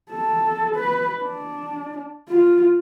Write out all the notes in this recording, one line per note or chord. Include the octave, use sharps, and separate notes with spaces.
A4
B4
D4
F4